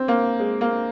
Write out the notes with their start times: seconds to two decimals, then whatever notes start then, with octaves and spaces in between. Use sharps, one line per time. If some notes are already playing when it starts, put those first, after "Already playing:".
Already playing: C4
0.08 A#3
0.40 G#3
0.61 A#3